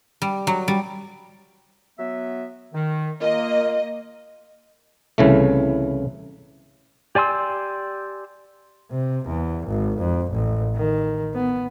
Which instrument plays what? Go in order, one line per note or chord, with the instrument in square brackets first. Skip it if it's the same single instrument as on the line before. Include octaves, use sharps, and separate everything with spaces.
[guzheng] G3
F#3
G3
[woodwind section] F#3 B3 E5
D#3
[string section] A#3 D#5 [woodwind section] F4 A#4
[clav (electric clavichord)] C2 C#3 E3 A3
[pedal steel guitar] G4 D5 G#5 C6 E6
[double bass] C3
E2
G#1
F2
A1
D#3
B3